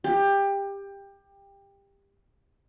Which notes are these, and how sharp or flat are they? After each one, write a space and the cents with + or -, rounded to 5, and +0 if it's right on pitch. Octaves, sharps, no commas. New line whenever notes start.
G4 +20